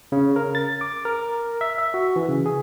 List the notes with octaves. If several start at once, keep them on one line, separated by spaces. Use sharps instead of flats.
C#3
A#4
A6
D6
A#4
E5
E5
F#4
E3
C#3
G#4